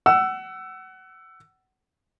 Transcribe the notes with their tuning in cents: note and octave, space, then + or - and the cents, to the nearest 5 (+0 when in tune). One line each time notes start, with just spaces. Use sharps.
F#5 +25 E6 +15